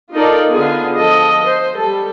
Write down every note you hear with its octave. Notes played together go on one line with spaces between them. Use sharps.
D#4 F4 A4 A#4 D5
D3 B3 F4 G#4
F3 A4 D#5
C5
G3 A4